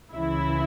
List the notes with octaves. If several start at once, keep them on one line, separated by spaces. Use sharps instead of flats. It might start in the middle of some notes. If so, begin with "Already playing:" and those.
C#2 C#3 E3 E4